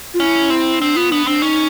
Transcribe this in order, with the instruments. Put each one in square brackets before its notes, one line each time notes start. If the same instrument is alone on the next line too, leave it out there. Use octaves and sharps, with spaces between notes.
[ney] F4
[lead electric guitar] C#4 [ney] E4
[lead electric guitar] C4
[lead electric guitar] C4 [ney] D4
[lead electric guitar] B3 [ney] F4
[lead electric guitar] B3 [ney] D4
[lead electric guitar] C4 [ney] D4
[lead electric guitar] C#4 [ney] D#4